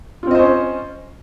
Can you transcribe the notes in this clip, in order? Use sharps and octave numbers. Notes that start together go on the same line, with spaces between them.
C4 C#4 F4 C5 D#5